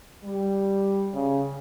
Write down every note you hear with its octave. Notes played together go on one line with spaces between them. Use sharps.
G3
C#3